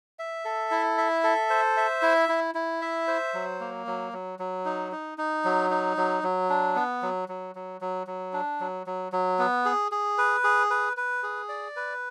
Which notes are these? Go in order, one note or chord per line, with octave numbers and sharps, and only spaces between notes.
E5
A4
E4
E5
A4
C5
E5
E4
E4
E4
E5
C5
F#3
A#3
F#3
F#3
F#3
D#4
D#4
D#4
F#3
D#4
F#3
F#3
D4
B3
F#3
F#3
F#3
F#3
F#3
D4
F#3
F#3
F#3
B3
G#4
G#4
B4
G#4
B4
B4
G#4
D5
B4